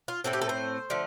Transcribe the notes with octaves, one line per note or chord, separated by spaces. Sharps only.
F4
A2 A3 C4 A4
G4
A4
C5
D3 F3 A3